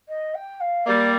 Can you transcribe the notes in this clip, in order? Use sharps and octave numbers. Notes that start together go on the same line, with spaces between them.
D#5
G5
F5
G3 A#3 D5